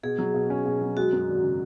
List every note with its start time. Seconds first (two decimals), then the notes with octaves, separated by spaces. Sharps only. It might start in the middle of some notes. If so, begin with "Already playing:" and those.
0.03 B2 G#4
0.19 F#3
0.34 B2
0.50 C#4
0.66 B2
0.81 F#3
0.97 G#3 F#4
1.13 F#2
1.28 G#1
1.43 C#3